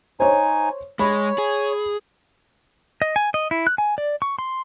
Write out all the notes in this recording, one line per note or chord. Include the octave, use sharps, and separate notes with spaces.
D#4 C5 C#5 G#5
G#3 C#5 B5
G#4
D#5
G#5
D#5
E4
F#6
G#5
D5
C#6
C6